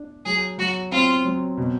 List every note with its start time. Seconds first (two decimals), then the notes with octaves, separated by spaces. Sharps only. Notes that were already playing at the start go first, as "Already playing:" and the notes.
Already playing: D4
0.25 F#3 G#4
0.58 F#3 F#4
0.91 C4 F4
1.25 F#3
1.57 B2